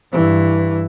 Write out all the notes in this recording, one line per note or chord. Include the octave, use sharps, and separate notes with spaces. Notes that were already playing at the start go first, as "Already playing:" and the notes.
G2 E3